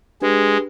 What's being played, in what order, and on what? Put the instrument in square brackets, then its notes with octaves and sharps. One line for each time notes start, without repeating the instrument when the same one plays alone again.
[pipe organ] G#3 [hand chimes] D4 G4 B4